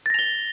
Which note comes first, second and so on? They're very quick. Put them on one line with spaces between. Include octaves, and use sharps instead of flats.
A6 A#6 F7 G7